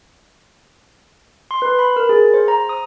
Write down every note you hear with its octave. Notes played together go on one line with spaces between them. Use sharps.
C6
B4
B5
A#4
G#4
C5
A#5
D#6